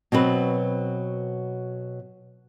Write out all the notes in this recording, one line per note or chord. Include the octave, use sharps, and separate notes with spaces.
B2 F#3 C4 B4